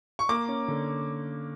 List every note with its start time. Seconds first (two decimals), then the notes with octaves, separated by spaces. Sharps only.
0.19 C#6
0.29 A#3 D6
0.48 C#4
0.68 D3